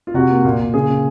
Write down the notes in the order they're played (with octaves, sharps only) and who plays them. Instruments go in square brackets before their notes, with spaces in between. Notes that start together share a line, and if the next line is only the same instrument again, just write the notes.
[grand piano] F4
C3 F#4
A#3
A#2
A#2
C#3 G#4
C#3